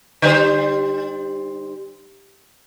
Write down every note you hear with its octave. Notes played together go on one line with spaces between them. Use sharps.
D3 G3 C5